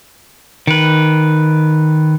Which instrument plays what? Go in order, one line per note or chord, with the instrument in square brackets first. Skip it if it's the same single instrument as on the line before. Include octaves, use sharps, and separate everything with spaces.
[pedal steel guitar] D#3 B4